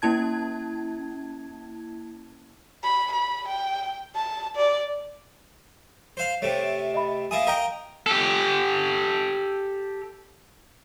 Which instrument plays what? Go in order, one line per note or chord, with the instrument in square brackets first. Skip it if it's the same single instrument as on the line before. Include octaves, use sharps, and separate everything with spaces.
[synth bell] A#3 C#4 E4 A5 G#6
[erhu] B5
B5
G5
A5
D5
[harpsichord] C5 F5
[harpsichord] C3 A3 [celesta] C#5
[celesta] D#5 E5 B5
[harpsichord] A#3 E4 D#6 [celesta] G#5
[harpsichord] A#4 D#5 G5 [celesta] F5 A#5
[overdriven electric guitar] G4 A4